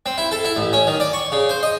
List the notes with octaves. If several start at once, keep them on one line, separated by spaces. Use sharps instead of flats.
C4
E4
A4
E4
A1
C#4
D#3
D5
C#6
C#3
C5
D#5